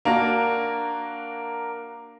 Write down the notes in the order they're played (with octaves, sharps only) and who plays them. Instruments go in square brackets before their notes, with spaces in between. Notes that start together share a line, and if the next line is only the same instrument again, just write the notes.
[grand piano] A#3 D4 F#4 A#4